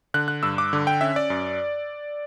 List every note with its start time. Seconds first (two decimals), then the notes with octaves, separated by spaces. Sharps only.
0.14 D3 F#6
0.28 F#6
0.43 G2 E6
0.58 D6
0.73 D3
0.87 G5
1.01 C#4 E5
1.16 D5
1.30 F#2